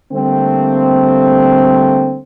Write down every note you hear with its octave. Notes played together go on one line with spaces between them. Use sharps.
D3 G3 A3 A#3 C4